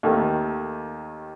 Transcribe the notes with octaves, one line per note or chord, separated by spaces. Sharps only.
D#2 D#3 A3